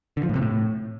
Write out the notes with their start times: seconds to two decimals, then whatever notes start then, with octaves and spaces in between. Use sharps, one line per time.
0.17 D3
0.23 F3
0.29 A2
0.35 C3
0.41 A2